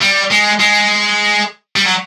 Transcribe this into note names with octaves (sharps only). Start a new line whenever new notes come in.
G3
G#3
G#3
G3
F#3